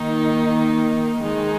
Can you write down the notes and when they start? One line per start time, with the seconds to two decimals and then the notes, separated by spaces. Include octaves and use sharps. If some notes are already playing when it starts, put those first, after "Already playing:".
Already playing: D#3 A#3 D#4
1.21 D#3 G#3 D#4 G#4